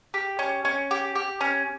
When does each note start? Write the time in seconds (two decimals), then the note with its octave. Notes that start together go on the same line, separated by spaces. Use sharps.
0.14 G4
0.39 C#4
0.65 C#4
0.91 G4
1.15 G4
1.41 C#4